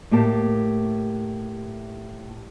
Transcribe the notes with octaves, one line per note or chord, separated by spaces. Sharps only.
A2 A3 A#3 G4 A5